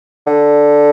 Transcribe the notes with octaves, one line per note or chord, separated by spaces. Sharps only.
D3